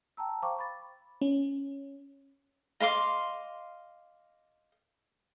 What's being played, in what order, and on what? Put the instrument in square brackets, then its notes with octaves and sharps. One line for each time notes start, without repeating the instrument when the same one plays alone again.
[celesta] G5 A5 A#5 E6
C5 F5 G5 A#5 C#6 D6
B5 A6
[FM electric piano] C#4
[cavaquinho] D#5 F5 C6 D6